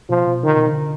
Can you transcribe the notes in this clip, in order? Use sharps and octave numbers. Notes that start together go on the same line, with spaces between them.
B2 F3
B2
D3 D#3
B2
D3